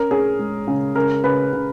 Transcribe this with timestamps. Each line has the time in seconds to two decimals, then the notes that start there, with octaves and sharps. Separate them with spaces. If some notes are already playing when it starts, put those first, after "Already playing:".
Already playing: C#4 A#4
0.11 C#4 G#4
0.39 G#3
0.67 C#3
0.96 C#3 A#4
1.24 C#3 B4
1.53 C#3